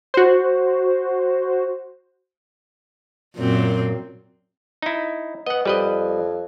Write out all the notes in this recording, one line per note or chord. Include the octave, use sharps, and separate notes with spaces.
F#4 C5
F#2 A#2 C4
D#4 E4
B3 D#5 F#5
F2 G3 B4 D#5